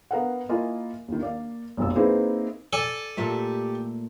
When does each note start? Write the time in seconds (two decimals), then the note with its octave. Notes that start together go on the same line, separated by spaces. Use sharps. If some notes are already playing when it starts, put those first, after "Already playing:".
0.11 B3 A#4 F5 F#5
0.49 A#3 E4 F4 A#4 D#5 G#5
1.08 D#2 D#3
1.21 A#3 D5 F5
1.77 F1 B1 F#2 A#3 E6
1.95 A#3 C4 D#4 E4 G#4 B4
2.73 A4 D5 G#5
3.17 A#2 A3 G4 E5